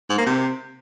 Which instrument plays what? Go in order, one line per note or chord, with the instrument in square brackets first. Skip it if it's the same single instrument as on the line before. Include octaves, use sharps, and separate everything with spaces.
[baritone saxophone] G#2
A#3
C3